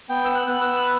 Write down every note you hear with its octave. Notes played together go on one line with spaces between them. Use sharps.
B3 G5
E6
F#6
B3 F#6
E6
F#6